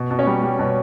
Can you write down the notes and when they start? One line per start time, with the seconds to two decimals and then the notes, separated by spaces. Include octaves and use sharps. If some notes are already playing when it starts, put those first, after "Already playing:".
Already playing: B2
0.11 B2
0.19 C#4 C#5
0.27 G3
0.43 G3
0.59 B2